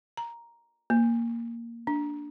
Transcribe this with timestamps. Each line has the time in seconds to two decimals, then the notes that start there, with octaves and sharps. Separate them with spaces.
0.17 A#5
0.90 A#3
1.87 D4